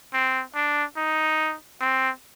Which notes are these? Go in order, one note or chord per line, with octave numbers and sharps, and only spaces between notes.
C4
D4
D#4
C4